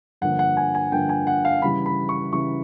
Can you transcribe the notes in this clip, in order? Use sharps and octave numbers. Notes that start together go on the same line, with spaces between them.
G2 D3 F3 A#3 F#5
F#5
G#5
G#5
G2 D3 F3 A#3 G5
G#5
F#5
F5
C#3 E3 G3 B5
B5
C#6
C#3 E3 G3 C#6